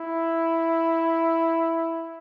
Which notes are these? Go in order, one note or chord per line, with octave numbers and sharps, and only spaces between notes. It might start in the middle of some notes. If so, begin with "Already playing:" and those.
Already playing: E4